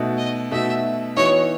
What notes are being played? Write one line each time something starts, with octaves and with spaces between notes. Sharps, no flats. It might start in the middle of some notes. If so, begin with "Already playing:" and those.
Already playing: B2 A3 D#4 F#4
D#5
B2 A3 D#4 F#4 E5
E3 B3 D#4 F#4 C#5